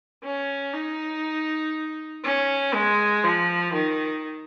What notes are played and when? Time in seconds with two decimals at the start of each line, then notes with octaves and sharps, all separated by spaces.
0.23 C#4
0.73 D#4
2.24 C#4
2.74 G#3
3.24 F3
3.74 D#3